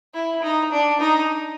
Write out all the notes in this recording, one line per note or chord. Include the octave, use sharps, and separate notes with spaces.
E4
D#4
D4
D#4